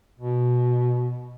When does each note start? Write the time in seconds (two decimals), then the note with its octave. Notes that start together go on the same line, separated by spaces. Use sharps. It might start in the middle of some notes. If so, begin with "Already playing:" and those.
0.20 B2